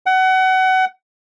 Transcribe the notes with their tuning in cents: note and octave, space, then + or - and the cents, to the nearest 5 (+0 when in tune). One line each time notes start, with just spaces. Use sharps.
F#5 +25